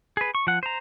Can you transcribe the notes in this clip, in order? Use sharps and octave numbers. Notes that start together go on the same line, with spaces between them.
G#4 B4
C#6
F3 F#5
C5 A#5